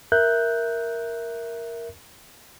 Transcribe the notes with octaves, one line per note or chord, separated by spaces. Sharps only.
A#4 E5 F#6 G6